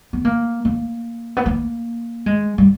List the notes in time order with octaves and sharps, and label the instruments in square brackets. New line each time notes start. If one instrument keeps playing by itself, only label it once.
[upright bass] B3
A#3
A#3
B3
A#3
G#3
G3